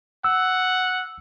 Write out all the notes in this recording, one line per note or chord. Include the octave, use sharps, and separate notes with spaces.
F#5 E6